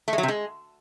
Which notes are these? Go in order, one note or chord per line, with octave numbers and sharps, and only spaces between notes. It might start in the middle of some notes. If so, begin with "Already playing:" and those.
A3
G#3
F#3
C3
G#3